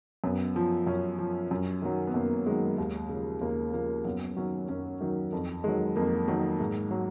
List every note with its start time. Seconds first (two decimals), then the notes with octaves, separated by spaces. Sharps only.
0.24 F#2 B3
0.56 F3
0.87 F#2 C#4
1.18 F3
1.51 F#2
1.82 D#3 F#3
2.07 B3
2.14 F#2 A#3
2.46 D#3 F#3 G#3
2.78 D#2
3.09 C#3 F3
3.41 D#2 A#3
3.73 C#3 F3 A#3
4.05 F#2 B3
4.37 D#3 F#3 C#4
4.69 F#2 C#4
5.01 D#3 F#3
5.33 F2
5.64 D#3 F#3 G#3
5.96 F2 A#3
6.28 D#3 F#3
6.60 G#2
6.91 F#3